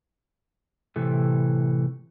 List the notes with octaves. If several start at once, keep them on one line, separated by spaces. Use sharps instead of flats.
A2 C3 E3 A4